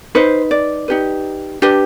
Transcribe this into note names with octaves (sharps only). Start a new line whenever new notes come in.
D#4 B4 C5
D5
D#4 G4 B4
D4 G4 B4